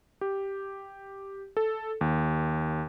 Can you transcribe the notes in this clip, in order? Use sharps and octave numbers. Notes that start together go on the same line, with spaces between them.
G4
A4
D#2